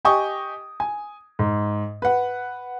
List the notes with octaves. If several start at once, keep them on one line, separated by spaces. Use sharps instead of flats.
G4 D#5 G5 G#5 C#6 D#6
G#5
G#2
B4 F#5